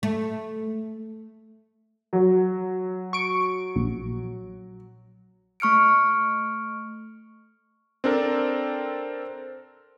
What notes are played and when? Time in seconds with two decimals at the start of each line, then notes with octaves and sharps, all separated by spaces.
0.03 A3
2.13 F#3
3.13 C#6 D7
3.76 A#1
5.60 A3 C#6 F6 C#7 D7
8.04 C4 D4 A4 A#4